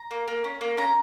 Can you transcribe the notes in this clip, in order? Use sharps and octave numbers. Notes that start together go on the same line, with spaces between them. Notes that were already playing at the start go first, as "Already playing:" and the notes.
Already playing: A#5
A#3
A#3
C#4
A#3
C#4 A#5